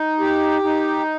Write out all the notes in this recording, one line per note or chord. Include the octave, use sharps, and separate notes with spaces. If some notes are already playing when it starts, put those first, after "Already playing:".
Already playing: D#4
G4
D#4